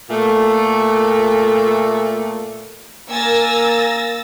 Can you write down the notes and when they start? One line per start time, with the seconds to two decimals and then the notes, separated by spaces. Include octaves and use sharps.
0.10 A#2 A3
3.11 A#3 A#4 G#5 E6 A6 A#6